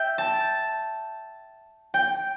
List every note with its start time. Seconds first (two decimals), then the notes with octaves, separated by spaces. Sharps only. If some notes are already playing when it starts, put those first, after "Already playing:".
Already playing: E5 G5
0.18 A5
1.94 G5